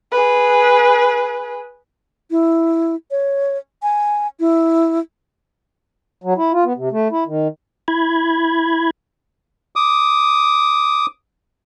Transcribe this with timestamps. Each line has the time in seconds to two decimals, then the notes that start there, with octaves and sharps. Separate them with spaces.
0.12 G#4 B4
2.31 E4
3.11 C#5
3.83 G#5
4.40 E4
6.24 F#3
6.37 E4
6.53 F4
6.65 B3
6.76 C3
6.92 A3
7.12 E4
7.27 D#3
7.88 E4 B5 G#6
9.76 D6 D#6